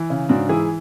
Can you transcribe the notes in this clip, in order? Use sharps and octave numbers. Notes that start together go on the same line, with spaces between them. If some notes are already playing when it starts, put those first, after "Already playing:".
Already playing: E3
C#3
G#2 D4 F#4
E3 E4 G#4